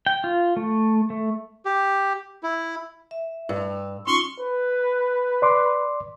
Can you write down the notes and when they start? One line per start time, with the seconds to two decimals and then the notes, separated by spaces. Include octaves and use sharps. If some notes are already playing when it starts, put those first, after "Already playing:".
0.06 G5
0.24 F4
0.57 A3
1.10 A3
1.65 G4
2.43 E4
3.11 E5
3.49 G2 E6
4.07 C#4 D#4 F4 C6 C#6
4.40 B4
5.42 D5 C6 D6